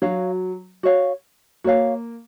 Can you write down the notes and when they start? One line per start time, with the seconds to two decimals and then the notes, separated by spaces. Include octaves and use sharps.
0.02 F#3 F#4 C#5 F5
0.83 F#4 C#5 F5
1.64 A#3 F#4 C#5 F5